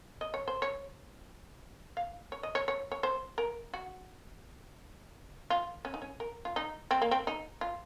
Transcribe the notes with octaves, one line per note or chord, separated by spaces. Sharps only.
D#5
C#5
C5
C#5
F5
C#5
D#5
C#5
C#5
C#5
C5
A#4
F#4
F4
C#4
D#4
C#4
A#4
F4
D#4
C4
A#3
C4
D#4
F4